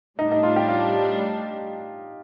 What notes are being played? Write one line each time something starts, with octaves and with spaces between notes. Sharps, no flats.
A2 G3 D4 D#4
D#4
F4
G4
F4